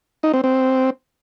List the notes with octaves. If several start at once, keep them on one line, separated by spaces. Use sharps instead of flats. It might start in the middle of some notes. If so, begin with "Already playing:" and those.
D#4
C4
C4